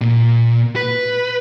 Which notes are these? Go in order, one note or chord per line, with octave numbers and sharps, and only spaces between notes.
A#2
B4